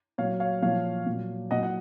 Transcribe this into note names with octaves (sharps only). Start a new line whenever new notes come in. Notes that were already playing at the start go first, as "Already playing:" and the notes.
A#2 F#3 C#5 F5
C#5 F5
A#2 F3 C#5 F5
A#2 F#3
A#2 F#3 D#5 F#5
F#5